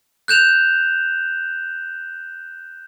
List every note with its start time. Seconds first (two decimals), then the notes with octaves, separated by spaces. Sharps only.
0.28 F#6 G6 E7 F7